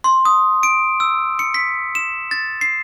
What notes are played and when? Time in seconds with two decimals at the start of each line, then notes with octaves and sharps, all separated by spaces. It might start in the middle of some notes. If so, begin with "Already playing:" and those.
0.04 C6
0.25 D#6
0.63 D7
1.00 E6
1.39 C#7
1.54 B6
1.95 E7
2.31 A6
2.61 C7